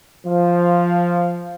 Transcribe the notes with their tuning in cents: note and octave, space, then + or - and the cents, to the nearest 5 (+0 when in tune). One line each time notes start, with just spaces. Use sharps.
F3 +0 F5 -10